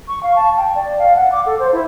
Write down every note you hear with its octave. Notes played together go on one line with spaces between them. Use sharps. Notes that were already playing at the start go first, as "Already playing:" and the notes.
C#6
F5
A5
G5
D5
F5
F#5
D6
A4
C5
E4